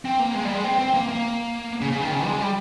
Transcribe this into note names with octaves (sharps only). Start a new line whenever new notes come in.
C4
A#3
G#3
G3
G#3
C4
C4
A#3
A#3
C#3
C#3
D#3
C#3
G#3
G3